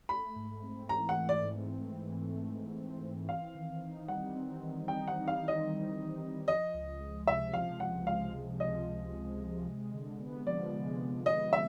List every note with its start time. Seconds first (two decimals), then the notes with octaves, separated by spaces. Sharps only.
0.09 A3 B5
0.36 G#2
0.62 C4
0.89 E3 A#5
1.09 F#5
1.16 A3
1.29 D5
1.42 G#2
1.70 C4
1.95 E3
2.23 A3
2.48 G#2
2.76 C4
3.02 E3
3.29 C4 F5
3.55 D#3
3.82 D#4
4.08 G3 F#5
4.35 C4
4.62 D#3
4.87 D#4 G5
5.08 F#5
5.14 G3
5.28 F5
5.41 C4
5.48 D#5
5.68 D#3
5.94 D#4
6.21 G3
6.47 F3 D#5
6.74 C#2
7.00 G#3
7.27 C3 E5
7.54 F3 F5
7.80 C#2 F#5
8.07 G#3 F5
8.33 C3
8.60 F3 D#5
8.86 C#2
9.14 G#3
9.40 C3
9.66 G#3
9.93 D3
10.20 B3
10.47 F3 D5
10.73 G#3
11.00 D3
11.26 B3 D#5
11.53 E5